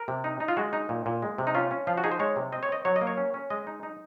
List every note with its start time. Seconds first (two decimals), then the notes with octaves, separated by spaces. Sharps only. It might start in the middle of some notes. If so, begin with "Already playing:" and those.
Already playing: A#4
0.08 C3
0.24 D#4
0.40 D#4
0.48 F4
0.57 G#3 F#4
0.73 D#4
0.89 A#2
1.06 A#2
1.22 G#3
1.38 C3
1.47 D#4
1.55 C#4 F4
1.71 C#4
1.87 F3 F4
1.97 F#4
2.04 D#4 G#4
2.12 C5
2.19 G#3 C#5
2.36 C3
2.52 C4 D#5
2.63 C#5
2.69 C4 D#5
2.85 F#3 C#5
2.96 D#5
3.01 A#3
3.07 C#5
3.17 C#4
3.34 C#4
3.50 G#3 D#5
3.67 D#4
3.83 D#4